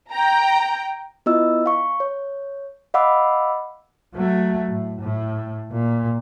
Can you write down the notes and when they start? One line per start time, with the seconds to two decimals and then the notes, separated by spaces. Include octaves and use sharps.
0.12 G5 A#5
1.26 B3 E4 F4 D#5 E6
1.66 F5 C#6
2.00 C#5
2.94 D#5 F5 F#5 B5 D6 E6
4.15 F#3 A3
4.69 A2
5.01 A2
5.72 A#2